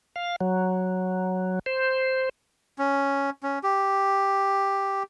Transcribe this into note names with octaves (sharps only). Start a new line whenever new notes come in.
F5
F#3
C5
C#4
C#4
G4